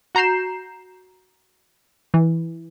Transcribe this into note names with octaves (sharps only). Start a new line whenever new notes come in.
F#4 A#5 G6 C7 E7
E3